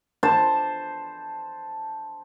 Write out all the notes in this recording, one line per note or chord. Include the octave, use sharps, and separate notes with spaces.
C5 A5